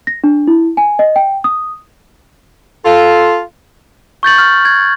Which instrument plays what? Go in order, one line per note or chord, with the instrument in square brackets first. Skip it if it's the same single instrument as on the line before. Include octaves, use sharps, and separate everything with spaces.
[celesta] A#6
D4
E4
G#5
D#5
G5
D#6
[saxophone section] F4 A4
[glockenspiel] C#6 G6 A6 F#7
F6
G#6